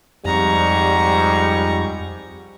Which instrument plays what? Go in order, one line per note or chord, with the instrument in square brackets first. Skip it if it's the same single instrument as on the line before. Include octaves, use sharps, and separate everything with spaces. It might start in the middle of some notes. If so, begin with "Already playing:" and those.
[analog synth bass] F2 [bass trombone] G#2 [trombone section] G3 [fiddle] A#5 C#6